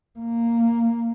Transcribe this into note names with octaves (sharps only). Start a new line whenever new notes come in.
A#3